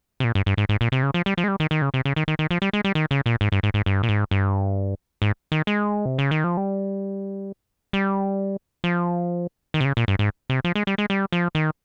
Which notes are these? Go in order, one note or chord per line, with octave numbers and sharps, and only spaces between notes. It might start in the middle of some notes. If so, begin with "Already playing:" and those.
C3
A#2
G2
G2
G#2
G#2
A#2
C3
C#3
F3
G3
F3
G#3
G3
D#3
D#3
C#3
C3
C#3
D#3
D#3
D#3
F3
G3
G#3
G3
D#3
C#3
A#2
G#2
G2
G#2
G#2
G2
A#2
G#2
G2
G#2
D#3
G#3
C3
C#3
D#3
F3
G3
G3
F3
D#3
C3
C#3
A#2
G2
G#2
C3
F3
G#3
G3
G#3
G3
F3
D#3